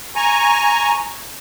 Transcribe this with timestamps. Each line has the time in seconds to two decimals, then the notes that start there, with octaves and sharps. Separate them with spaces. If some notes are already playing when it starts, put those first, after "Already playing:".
0.15 G#5 A#5 C#6